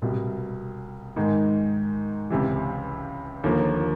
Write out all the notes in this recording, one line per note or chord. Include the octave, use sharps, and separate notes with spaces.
C2 B2 G3
G#2 D#3 G#3
C#2 C3 E3
D#2 D3 F3 A#3